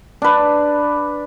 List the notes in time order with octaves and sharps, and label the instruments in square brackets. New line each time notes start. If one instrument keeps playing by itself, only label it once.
[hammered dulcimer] D4 B4